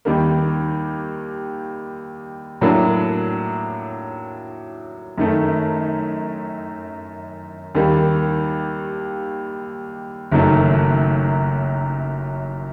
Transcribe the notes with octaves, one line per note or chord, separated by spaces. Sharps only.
D#2 D#3 G3 A#3
A2 F#3 A#3 D4
F#2 D#3 A3 D#4
D#2 D#3 G3 A#3
F#1 F#2 D#3 F#3 A3